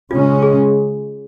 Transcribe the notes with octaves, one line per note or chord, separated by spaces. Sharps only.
C#3 G#3 C#4 F4
G#4